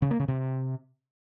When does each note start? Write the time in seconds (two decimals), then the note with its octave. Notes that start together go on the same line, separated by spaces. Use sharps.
0.02 C#3
0.11 A#3
0.19 C#3
0.28 C3